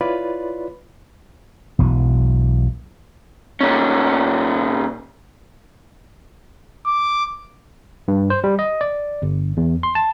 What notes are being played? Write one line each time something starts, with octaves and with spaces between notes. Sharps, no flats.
E4 F4 B4 C#5 D5 B5
E1 B1 E3 F#3
A#2 C#4
D6
G2
C5
G3
D#5
D5
G1
E2
C6
A5